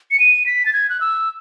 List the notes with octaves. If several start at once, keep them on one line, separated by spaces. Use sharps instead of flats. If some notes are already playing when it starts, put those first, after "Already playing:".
C#7
D#7
B6
A6
G#6
F#6
E6